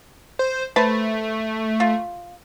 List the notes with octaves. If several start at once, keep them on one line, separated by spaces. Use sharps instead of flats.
C5
A3 B4 C5 A5
F4